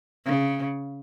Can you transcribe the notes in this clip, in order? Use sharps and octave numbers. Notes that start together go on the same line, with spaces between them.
C#3